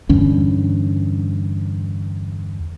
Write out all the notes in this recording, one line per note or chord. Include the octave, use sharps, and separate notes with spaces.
E2 G2 D3 C#4